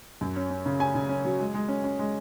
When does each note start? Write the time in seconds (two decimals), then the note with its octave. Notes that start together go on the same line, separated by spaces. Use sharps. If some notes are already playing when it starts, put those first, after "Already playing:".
0.21 F#2
0.36 C#4
0.50 C#4
0.66 C#3
0.80 C#4 G#5
0.95 C#3
1.09 C#4
1.25 F#3
1.39 G#3
1.54 G#3
1.68 C#4
1.84 C#4
1.99 G#3